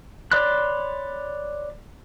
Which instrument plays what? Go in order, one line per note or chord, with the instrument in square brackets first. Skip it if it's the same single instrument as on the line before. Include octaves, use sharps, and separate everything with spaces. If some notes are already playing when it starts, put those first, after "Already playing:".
[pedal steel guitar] C#5 D5 B5 C6 F#6